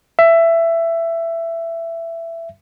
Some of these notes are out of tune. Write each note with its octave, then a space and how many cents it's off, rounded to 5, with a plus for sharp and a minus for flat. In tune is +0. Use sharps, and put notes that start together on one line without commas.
E5 +15